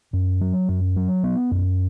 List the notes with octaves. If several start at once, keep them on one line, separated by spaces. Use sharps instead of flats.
F#2
F#3
F#2
F#3
B3
F#2